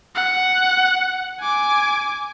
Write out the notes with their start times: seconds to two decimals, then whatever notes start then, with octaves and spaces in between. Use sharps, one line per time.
0.15 F#5
1.40 G#5 D6